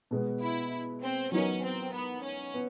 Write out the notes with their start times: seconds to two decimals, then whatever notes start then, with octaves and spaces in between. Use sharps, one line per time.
0.11 B2 G#3 B3
0.42 E4
1.02 C4
1.32 F#3 B3 C#4 D#4 F#4 A#4
1.63 C4
1.93 B3
2.23 C#4
2.54 B3